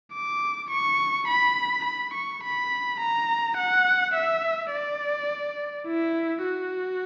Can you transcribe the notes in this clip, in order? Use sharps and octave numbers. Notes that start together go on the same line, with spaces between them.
D6
C#6
B5
B5
C#6
B5
A#5
F#5
E5
D5
E4
F#4